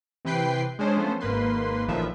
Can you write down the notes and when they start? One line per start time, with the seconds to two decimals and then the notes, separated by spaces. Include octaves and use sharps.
0.25 C3 E3 B4 G5 C7
0.79 G#3 C#4 D4 C5
0.96 F3 A3 B3 C#4 C5
1.21 G#1 G#2 A#3 B4 C6
1.88 A1 A#2 D#3 F3 B4 E5